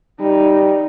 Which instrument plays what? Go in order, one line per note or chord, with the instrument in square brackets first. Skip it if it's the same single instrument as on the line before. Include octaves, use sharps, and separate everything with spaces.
[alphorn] G3 [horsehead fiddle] D#4